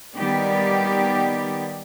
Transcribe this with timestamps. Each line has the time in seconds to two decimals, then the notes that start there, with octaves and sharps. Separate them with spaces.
0.16 D#3 G3 B3 G4 D5